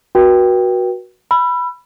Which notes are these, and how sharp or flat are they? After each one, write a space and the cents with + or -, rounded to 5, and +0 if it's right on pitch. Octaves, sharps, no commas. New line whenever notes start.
F#4 +0 B4 -40 G5 +0
B5 +0 E6 +35